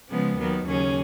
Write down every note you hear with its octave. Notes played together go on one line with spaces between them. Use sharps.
C#3 F3 G#3 B3
D#2 D#3 F#3 B3
D#2 C#3 F#3 C#4 G#4